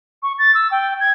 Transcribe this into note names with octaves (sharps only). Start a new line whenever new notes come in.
C#6
A6
E6
G5
G#6